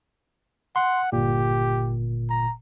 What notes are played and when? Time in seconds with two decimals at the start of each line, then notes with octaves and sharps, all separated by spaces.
0.76 F#5 C6
1.13 G1 A#2 G4
2.30 A#5